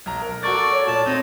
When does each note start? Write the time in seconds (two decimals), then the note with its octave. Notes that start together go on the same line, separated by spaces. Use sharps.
0.06 B1 A#5
0.22 A#4
0.43 F#4 A4 D5 C#6 A6
0.72 C#5
0.87 A#2 A5
1.06 C4 D#4